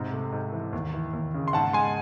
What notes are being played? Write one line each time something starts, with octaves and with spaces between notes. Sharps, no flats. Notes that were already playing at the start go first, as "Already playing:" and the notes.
Already playing: G#2 C3
A3
G#2
E3
D#2
E3
D#2
C#3
C6
G#2 F#5 A5
G#3 G#5 C6